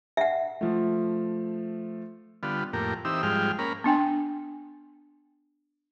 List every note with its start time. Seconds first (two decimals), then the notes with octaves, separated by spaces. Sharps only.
0.17 E5 F#5
0.61 F3 A3
2.43 D3 G3 B3 F4
2.73 F2 A2 A#3 G4 A#4
3.05 E3 C4 D#4 G4 E6
3.23 G#2 F3 G3 G#3 G5 F6
3.59 A#3 C#4 A#4 B5
3.84 B3 D4 G5 G#5